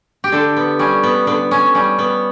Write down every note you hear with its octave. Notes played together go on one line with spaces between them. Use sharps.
G4
D3 A4
B3
G3 C#4
B3
D3 B3
C#4
G3 C#4
B3